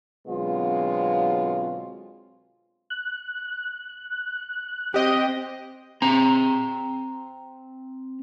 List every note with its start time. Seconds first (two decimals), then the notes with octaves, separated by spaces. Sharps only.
0.27 B2 D3 F#3 G#3 C4 F4
2.90 F#6
4.94 C4 G4 D#5 G5
6.02 C4 A#5